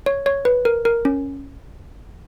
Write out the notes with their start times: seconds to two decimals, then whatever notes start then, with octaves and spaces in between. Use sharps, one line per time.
0.06 C#5
0.26 C#5
0.45 B4
0.65 A#4
0.85 A#4
1.05 C#4